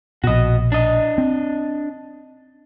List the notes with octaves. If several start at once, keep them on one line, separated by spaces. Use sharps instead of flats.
A#1 B2 F#4 D#5
D4 D#5
C4